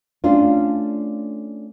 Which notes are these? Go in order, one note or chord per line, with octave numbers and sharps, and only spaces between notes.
A3 C#4 D4 F4